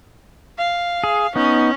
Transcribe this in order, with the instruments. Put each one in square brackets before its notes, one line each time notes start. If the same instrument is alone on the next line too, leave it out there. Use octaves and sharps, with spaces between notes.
[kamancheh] F5
[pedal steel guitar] G#4
[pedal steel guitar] B3 D#4 [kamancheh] C#4